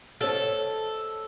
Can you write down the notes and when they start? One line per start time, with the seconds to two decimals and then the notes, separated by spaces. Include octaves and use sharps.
0.21 A4 C5 C#5 D#5